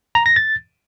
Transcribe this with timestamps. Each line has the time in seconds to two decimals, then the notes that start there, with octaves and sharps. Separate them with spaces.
0.15 A#5
0.26 A#6
0.36 A6